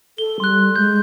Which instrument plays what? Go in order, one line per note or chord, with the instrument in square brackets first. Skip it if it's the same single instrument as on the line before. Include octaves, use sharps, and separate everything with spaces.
[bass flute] A4 [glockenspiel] G7
[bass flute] G3 [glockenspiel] C6 F#6
[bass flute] G#3 [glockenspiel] G6